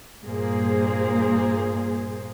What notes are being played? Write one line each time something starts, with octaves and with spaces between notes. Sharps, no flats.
G2 A#2 A#3 G#4 C5